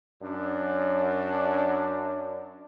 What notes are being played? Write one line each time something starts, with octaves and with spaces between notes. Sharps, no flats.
F#2 D4